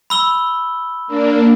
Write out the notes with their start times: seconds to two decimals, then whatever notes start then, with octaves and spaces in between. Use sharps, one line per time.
0.10 B5 E6 G7
1.07 A#3 D4